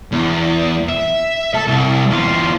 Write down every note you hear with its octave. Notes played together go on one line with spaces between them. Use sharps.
E2
E5
A4
C2
E2 F4